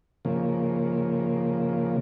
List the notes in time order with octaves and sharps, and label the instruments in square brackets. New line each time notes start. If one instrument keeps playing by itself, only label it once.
[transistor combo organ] C#3 F3 A#3